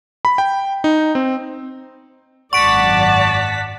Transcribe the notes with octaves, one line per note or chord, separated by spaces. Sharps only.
B5
G5
D#4
C4
G#1 F#2 D5 F#5 A5 C#6 B6 D7